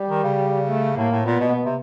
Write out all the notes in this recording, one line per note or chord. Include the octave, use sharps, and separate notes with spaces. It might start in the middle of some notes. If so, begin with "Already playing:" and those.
Already playing: G3
D#3
C#3
A3
A2 A#3
A2
A#2 B3
B2
B2
C3